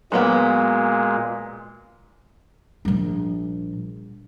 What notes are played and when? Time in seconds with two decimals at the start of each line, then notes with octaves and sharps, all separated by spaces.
0.12 A#2 F#3 G#3 A#3 B3
2.85 A#1 G3